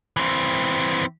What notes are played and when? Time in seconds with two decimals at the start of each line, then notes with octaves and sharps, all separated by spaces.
0.17 E3 C4